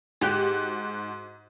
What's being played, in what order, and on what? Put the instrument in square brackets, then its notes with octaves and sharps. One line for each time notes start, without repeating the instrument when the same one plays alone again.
[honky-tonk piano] G#2 F#4 F#6 [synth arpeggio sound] G4